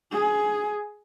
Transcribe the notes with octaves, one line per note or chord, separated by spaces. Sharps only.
G#4